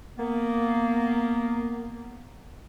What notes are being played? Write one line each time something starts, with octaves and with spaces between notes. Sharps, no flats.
A#3 B3